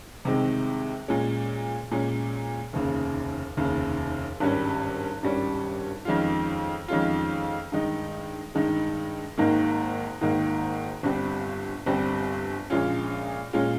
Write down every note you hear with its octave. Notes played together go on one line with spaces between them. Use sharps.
C2 C3 D#3 G#3 C4
A#2 G#3 C#4
A#2 G#3 C#4
F1 D#2 C#3
F1 D#2 C#3
G#1 G2 G3 C#4
G#1 G2 G3 C#4
F2 D#3 G#3 C#4 F4
F2 D#3 G#3 C#4 F4
G2 D#3 G#3 D#4
G2 D#3 G#3 D#4
G#1 G#2 D#3 A#3
G#1 G#2 D#3 A#3
G1 G2 G3 C4
G1 G2 G3 C4
A#1 A#2 G#3 C#4 F4
A#2 G#3 C#4 F4